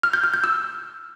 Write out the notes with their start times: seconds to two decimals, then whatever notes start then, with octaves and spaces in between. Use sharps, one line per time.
0.03 F6
0.13 G6
0.24 F6
0.34 G6
0.44 E6